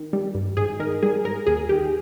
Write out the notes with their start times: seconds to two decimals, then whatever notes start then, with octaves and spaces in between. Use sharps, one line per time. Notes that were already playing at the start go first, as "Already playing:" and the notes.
Already playing: D#3
0.13 G3
0.35 G2
0.57 G#2 G#4
0.80 D#3 A#4
1.02 G3 G#4
1.24 G#2 A#4
1.46 D#2 G#4
1.69 D#3 G4